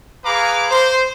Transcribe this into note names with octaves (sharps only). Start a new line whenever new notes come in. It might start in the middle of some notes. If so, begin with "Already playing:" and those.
G#4 B4 F5 A#5 D6
C5